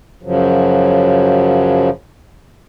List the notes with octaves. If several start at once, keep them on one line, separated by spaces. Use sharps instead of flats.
F#2 C#3 F3 F#3